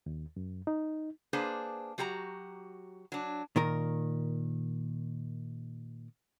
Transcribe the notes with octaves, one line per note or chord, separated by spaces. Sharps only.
D#2
F#2
D#4
A#3 D4 G#4 B4 C5
F#3 F#4 G4 G#5 A#5
F#3 D4
A#2 D#3 A#4